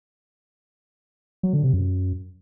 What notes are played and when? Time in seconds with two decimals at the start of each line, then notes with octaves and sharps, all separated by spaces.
1.43 F#3
1.53 D3
1.63 C3
1.73 F#2